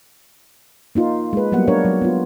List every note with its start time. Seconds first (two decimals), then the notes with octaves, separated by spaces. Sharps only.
0.95 A#3 D#4 F4
1.33 G#3 B4
1.52 F#3 G3 A#3 B3 F#5
1.68 D4 A#4 C#5
1.85 F#3
2.02 B3 F4